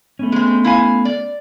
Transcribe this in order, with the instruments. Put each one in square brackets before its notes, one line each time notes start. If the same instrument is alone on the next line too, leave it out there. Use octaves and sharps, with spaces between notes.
[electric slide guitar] A3 B3 C#4
[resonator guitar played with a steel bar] G#3 C4
E4 F5 G#5
D5